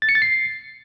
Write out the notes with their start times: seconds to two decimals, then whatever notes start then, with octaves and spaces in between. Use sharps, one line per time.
0.02 A6
0.09 C#7
0.15 A6
0.22 C7